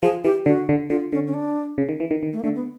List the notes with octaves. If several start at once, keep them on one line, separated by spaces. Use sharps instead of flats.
F3 G#4
E3 G4
D3 F#4
D3
D3 F4
D3 C#4
C#4
D4
C#3
D#3
E3
D#3
D#3
A3
A#3
D3 A3
B3